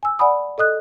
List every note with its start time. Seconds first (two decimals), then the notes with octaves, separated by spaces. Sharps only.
0.03 G#5 E6
0.19 D5 F#5 G#5 B5 D#6
0.58 A4 D#5 D#6 F#6